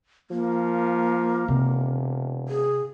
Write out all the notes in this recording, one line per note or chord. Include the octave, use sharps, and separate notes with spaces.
F3 A#3
E1 C3
G#4